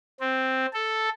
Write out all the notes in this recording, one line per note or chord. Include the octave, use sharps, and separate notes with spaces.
C4
A4